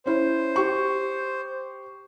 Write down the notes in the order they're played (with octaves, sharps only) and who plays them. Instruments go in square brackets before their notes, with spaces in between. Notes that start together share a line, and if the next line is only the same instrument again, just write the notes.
[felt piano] C#4 E4 C#5 [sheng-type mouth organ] C5
[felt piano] G4 C#6